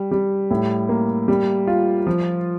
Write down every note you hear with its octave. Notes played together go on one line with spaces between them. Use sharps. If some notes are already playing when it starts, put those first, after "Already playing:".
Already playing: G3
G3
A2
A#3
G3
F4
F3